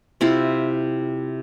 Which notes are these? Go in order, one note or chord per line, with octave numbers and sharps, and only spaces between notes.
C3 E4 F4 C6